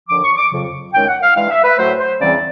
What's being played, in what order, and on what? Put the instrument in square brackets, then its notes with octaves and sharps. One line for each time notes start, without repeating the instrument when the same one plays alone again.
[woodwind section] D#2 D3 F3 D6
C#6
D6
F2 C#3 F#3
F#2 D#3 G#3 C#4 G5
F#5
F5
G2 E3 G#3 F5
E5
B4
A2 F#3 A3 C5
C5
E2 C#3 E3 G3 C4 D5